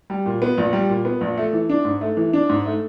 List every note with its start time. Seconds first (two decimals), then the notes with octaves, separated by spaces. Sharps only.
0.10 G3
0.26 A#2
0.42 B3
0.58 A#1
0.73 G3
0.89 A#2
1.05 B3
1.21 A#1
1.38 A3
1.53 E3
1.69 D4
1.85 G#2
2.01 A3
2.17 E3
2.33 D4
2.49 G#2
2.66 A3